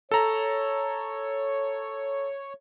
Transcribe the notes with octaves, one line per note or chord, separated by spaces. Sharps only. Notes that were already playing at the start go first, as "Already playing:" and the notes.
A4 C#5 A#5